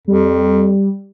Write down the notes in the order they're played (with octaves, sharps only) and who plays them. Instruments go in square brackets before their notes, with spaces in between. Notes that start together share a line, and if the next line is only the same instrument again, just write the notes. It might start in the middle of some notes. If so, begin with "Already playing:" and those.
[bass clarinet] F2 [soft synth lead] G3